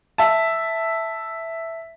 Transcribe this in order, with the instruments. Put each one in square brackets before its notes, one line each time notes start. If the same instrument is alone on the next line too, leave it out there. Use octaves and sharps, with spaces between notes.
[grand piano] E5 A5